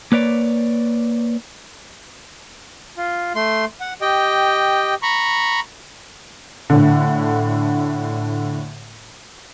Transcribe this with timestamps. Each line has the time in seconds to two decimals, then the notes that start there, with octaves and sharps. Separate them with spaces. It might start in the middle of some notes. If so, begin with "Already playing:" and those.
0.12 A#3 B4 C#5 D5
2.97 F4
3.35 A3 C6
3.80 F#5
4.01 G4 D#5 G5
5.02 A#5 B5 C#6
6.70 A2 D3